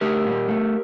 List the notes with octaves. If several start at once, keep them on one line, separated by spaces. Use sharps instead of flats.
A3 G4 A#4
A#2
A3